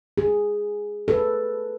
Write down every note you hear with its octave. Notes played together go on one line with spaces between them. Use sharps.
G#4
A4 B4